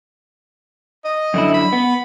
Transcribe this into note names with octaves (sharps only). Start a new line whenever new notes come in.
D#5
F#2 D3 E4
B5
B3